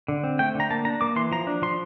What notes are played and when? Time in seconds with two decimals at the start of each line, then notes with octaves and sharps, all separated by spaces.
0.08 D3
0.24 C4
0.39 A3 G5
0.55 D3 A#5
0.70 A#3 A5
0.85 D4 A#5
1.01 A#3 D6
1.16 E3 C6
1.31 F3 A#5
1.47 D4
1.62 F3 C6